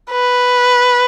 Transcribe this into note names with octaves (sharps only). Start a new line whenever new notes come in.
B4